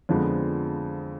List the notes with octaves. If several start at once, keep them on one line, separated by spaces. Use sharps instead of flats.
F2 D3 F3 G#3 B3